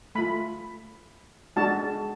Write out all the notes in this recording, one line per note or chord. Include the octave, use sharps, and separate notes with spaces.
A3 F4 B5
G#3 D4 F#4 A5